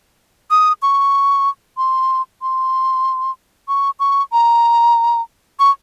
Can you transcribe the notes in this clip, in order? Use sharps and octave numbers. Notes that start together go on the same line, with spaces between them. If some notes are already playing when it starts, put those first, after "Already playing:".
D#6
C#6
C6
C6
C#6
C#6
A#5
C#6